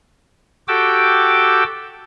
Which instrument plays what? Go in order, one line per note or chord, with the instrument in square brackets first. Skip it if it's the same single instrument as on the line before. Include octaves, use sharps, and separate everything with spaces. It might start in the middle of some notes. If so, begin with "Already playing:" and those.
[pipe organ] F#4 G4 A4 G5 D6 E6